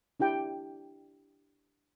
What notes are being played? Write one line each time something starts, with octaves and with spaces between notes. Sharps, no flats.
D4 E4 G4 G5